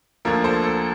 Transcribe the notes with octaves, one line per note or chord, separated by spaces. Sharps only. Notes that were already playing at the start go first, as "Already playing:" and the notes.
D2 D3 F3 A#3 A#4
A4 C5
A4